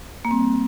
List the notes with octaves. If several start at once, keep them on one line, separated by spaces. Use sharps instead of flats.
A#3
G3 C4